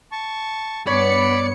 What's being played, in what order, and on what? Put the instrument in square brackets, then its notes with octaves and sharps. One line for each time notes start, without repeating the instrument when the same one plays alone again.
[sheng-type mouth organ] A5 C#6
[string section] G2 B3 C#7 [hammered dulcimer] C#5 [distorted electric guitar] D5 [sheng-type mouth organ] B5